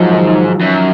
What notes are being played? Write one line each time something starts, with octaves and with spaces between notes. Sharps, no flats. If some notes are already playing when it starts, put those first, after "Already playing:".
Already playing: G#2 F3 F#3
D#3
F#2